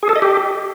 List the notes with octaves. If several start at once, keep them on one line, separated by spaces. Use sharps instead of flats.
G#4
A4
D#5
G4